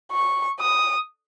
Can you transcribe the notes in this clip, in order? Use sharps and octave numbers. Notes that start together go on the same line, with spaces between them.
C#6
D#6